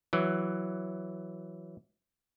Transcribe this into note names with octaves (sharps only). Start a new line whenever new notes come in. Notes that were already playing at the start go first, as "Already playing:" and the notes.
E3 F#3